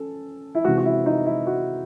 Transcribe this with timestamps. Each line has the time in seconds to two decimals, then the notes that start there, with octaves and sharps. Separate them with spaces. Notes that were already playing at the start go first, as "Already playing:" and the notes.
Already playing: C#4 A4
0.55 E4
0.65 C3 E3 G#3 F#4
0.78 F#4
0.85 E4
1.06 D#4
1.26 E4
1.47 F#4